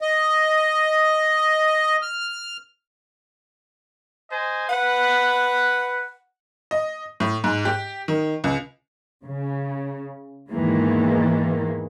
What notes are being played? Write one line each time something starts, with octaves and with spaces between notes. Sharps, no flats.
D#5
F6
C5 D#5 G#5
B4 F#5
D#5
A2
G#2
G4
D#3
C#2
C#3
E2 G#2 D#3 E3 G#3 A#3